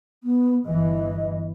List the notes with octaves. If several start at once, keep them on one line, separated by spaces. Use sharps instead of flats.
B3
G1 E3 D#5